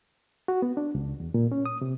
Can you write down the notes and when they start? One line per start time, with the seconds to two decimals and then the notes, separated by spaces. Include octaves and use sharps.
0.48 F#4
0.62 B3
0.77 D4
0.95 C#2
1.20 E2
1.34 A#2
1.52 C#4
1.66 D#6
1.81 C3